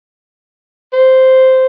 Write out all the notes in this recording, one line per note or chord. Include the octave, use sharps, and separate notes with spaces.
C5